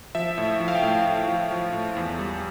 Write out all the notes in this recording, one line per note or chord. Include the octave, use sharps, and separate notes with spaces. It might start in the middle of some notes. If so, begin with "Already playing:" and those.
F3 E5
A2
F3
F5
G5
A2
A2
F3
F3
A2
E2
G3